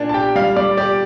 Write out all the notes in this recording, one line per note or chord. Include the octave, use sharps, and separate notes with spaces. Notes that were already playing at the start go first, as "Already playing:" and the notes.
Already playing: A#2 D4
A5
G4 G5
G3 F5
G3 D5
G4 D5